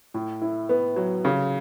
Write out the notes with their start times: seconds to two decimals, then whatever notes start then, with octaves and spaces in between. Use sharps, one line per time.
0.14 A2
0.41 E4
0.69 B3
0.96 F#3
1.25 C#3